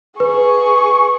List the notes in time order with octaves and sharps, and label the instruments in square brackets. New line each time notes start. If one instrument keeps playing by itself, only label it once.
[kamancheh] G#4 C#6 [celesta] B4